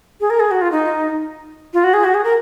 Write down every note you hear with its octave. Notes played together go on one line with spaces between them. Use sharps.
G#4
A#4
G#4
F#4
F4
D#4
F4
F#4
G#4
F#4
G#4
A#4